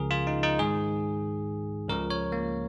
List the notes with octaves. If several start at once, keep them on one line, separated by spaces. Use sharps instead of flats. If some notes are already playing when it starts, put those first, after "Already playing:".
Already playing: C#2 C#3 F3 G#4 A#4
F4
D#4
D#4
G#2 D#3 G#4
C#2 C#3 F3 A#4
C#5
A#3